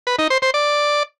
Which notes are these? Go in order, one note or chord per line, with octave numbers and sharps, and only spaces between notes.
B4
D#4
C5
C5
D5